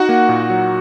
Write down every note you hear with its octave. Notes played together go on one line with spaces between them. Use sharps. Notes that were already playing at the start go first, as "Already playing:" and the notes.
Already playing: D#4 F#4 F#5
A#3
A#2
F#3